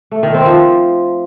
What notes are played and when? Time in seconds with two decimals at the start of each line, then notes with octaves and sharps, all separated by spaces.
0.11 A3
0.23 D#3
0.34 C4
0.46 F3